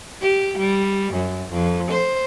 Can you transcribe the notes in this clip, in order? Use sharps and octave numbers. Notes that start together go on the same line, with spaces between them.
G4
G3
F#2
F2
C5